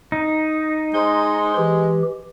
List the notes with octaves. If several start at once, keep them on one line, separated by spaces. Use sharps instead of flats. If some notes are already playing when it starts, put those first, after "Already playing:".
D#4
G#3 C5 C6
E3 G4